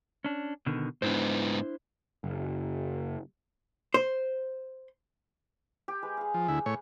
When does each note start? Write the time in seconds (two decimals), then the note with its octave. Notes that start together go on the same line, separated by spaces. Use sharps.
0.24 C#4 D4
0.66 B2 D3 D#3
1.02 G#2 B3 D4 E4 C5
2.24 F#1
3.94 C5
5.88 G4 G5
6.03 G#3 B4
6.17 G#4 F5
6.34 F3
6.48 D2 E4
6.66 A2 C#5